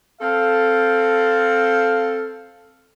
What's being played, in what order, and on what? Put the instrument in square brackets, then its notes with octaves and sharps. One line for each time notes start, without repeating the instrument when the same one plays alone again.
[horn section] C4 A4 [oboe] F5